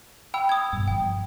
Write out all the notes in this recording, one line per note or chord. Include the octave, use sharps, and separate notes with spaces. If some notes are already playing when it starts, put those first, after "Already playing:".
G5 B5 E6
D#6 G#6
G2 B2
G1 F3 G5